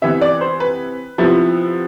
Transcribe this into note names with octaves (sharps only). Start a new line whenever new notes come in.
C3 E3 B3 E5
D5
C5
B4
C3 F3 B3 E4